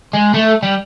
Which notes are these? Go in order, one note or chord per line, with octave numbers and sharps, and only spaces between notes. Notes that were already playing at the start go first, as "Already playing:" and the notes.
G#3
A3
G3